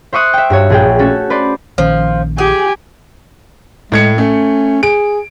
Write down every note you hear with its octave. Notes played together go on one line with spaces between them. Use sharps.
C5 E5 C#6 D#6 F#6
E5 G5
G2 F#4 C#5
A#1 G#4 G5
A3 C#4 F#4 A4
B4 C5 D5
A#1 D#3 F3 C#4
G4 G#4 G#5
A2 G#3 G#6 C#7
A3 C#4
G#4 D7